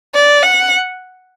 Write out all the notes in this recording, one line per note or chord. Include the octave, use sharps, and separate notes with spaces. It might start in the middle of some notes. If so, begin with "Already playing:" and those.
D5
F#5